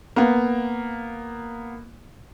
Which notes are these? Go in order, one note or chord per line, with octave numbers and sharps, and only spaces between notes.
A#3 B3